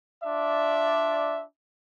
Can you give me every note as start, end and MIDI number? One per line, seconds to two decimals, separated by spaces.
0.24 1.43 62
0.24 1.43 65
0.24 1.43 74
0.24 1.43 76